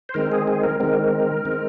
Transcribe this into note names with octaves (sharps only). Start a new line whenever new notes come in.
C5
D#3 G#3 C4 A#4
G#4
G#4
A#4
D#3 G#3 C4 A#4
D#3 G#3 C4